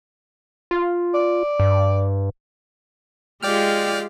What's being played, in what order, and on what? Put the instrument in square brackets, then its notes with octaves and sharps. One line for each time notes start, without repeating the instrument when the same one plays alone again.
[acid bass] F4
[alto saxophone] D5
[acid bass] G2
[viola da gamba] G#3 F4 G4 [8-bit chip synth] D5 G5 F6